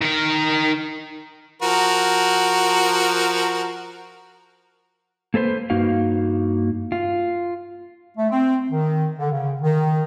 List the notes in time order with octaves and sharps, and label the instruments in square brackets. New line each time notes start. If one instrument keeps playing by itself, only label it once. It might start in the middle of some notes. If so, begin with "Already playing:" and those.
[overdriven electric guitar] D#3 A#4
[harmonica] F3 F#4 A#4
[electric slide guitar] A#3 A4 B4 C5
G2 A#3 D#4 F#4 F5
F4
[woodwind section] A3
C4
D#3
D3
C#3
D#3